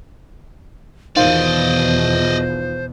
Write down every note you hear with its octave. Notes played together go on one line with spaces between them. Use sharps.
E2 B2 D#3 F4 C5 D5 D#5